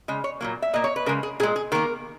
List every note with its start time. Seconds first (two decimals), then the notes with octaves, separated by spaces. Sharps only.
0.08 C#3 G#3 D#5
0.24 C#5
0.41 A#2 F#3 A#3
0.62 E5
0.73 A#2 A#3 D#5
0.84 C#5
0.96 B4
1.06 C#3 G#3 A#4
1.23 G#4
1.40 A#2 G#4
1.43 G#3
1.56 G#4
1.72 D#3 A#3 A#4